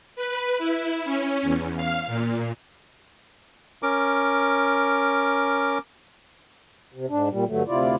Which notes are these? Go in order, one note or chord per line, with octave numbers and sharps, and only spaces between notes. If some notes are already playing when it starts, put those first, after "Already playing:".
B4
E4
C#4
E2
F5
A#2
C#4 A#4 D6
C3
G#2 D4
A#2 G3
G2 D3 F#3 A3
D2 C3 E4 F4 D5